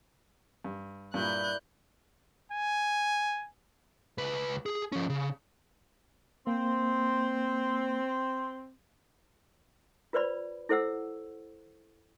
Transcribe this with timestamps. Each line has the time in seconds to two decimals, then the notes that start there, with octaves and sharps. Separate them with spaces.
0.64 G2
1.14 G2 A#2 E4 A#4 D5 F#6 G6
2.52 G#5
4.18 C#2 B4
4.66 G#4
4.92 F3 C#4
5.10 C#3
6.47 A#3 C4
10.13 F4 B4 C5 D5 B5
10.69 E4 A4 C5 F#5 E6